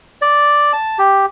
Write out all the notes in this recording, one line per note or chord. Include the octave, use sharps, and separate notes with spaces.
D5
A5
G4